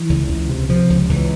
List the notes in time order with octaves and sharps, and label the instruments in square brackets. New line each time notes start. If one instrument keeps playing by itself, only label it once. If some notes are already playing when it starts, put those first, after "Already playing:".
Already playing: [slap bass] E3
C#2
C#2
C3
C3 F3
C#2
C#2 E3